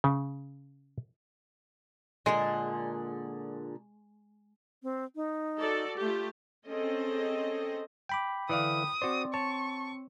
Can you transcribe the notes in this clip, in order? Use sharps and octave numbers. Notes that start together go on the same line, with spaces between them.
C#3
A#2 D3 G#3 G#4
C4
D#4
F#4 A4 D5
A3 F4 G4
C4 C#4 G#4 A4 D#5
G5 B5 D6
D3 E3 D5 F5 D#6
C4 F#4 C5 D5
C#5 A5 C#6